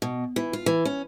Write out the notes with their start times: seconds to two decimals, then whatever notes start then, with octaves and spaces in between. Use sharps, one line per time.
0.02 B2
0.36 E3
0.53 F4
0.66 E3
0.85 C#4